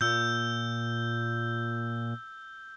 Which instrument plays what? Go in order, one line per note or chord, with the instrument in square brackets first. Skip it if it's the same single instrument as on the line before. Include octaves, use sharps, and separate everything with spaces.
[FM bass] A#2 [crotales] E6 G6